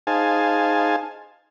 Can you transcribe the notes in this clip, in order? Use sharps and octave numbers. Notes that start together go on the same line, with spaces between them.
D#4 G#4 C5 F5 G#5 A5